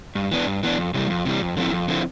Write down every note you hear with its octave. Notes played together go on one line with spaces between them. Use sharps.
G2
E3 B3 D4
G2
E3 B3 D4
F2
C3 E3 G3
F2
C3 E3 G3
F2
D3 F3 C4 E4
F2
D3 F3 C4 E4